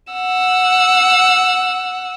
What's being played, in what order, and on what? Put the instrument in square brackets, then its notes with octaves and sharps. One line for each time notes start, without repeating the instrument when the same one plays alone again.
[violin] F#5 E6